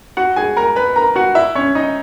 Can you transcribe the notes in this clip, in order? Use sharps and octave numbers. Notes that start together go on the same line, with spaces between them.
F#4 F#5
G#4 G#5
A#4 A#5
B4 B5
A#4 A#5
F#4 F#5
E4 E5
C#4 C#5
D#4 D#5